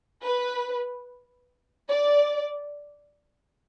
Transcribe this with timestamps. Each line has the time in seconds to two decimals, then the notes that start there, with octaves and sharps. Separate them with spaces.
0.23 B4
1.90 D5